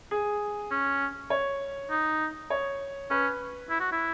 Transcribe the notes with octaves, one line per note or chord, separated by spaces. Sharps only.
G#4
C#4
C#5
D#4
C#5
C#4 B4
E4
F#4
E4